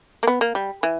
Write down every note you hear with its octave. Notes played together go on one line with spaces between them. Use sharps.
A#3
B3
A#3
G3
E3